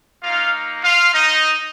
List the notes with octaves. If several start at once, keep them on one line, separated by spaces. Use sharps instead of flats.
A#3 D#4 F4 F5
F4 F5
D#4 D#5